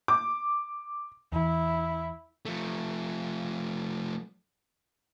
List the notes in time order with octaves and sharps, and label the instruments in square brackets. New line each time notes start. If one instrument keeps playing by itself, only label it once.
[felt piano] D6
[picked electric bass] E2 E3 [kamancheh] E4
[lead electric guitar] F3 A3